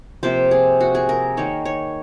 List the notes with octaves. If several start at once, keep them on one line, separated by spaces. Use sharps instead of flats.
C3 F3 A#3 C5
G#4
F#4
G#4
A#4
D#3 A#3 C#5
C#5